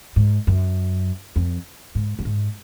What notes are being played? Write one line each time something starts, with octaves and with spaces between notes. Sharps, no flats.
G#2
F#2
F2
G#2
F#2
G#2